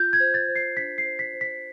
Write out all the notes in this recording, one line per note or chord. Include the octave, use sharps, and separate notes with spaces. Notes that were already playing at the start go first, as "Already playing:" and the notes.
Already playing: F4 G6
G#6
C5
A6
C5
C7
D4 B6
C7
C5
B6
C5
B6